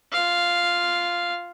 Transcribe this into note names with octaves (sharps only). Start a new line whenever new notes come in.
F4 F5